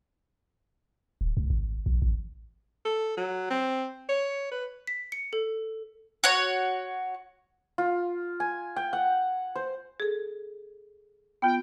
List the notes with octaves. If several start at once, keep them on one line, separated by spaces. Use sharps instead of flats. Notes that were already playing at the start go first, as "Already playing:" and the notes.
D1
C#2
G#1
A#1
A1
A4
F#3
C4
C#5
B4
B6
C#7
A4
F#4 C#5
F4
G#5
G5
F#5
C5
G#4 A4
B3 F4 G5